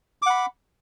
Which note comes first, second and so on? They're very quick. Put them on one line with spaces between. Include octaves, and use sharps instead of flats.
D6 F#5 B5